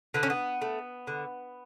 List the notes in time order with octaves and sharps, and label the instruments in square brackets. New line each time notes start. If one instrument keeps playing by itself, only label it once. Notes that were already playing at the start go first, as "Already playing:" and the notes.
[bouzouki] D3 B3
C#4
B3
A3
D3